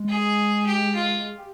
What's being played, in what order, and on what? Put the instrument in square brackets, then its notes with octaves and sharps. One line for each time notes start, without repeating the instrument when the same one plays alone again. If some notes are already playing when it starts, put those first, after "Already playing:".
Already playing: [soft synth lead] G#3
[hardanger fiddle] G#4
G4
F4
[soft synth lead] G4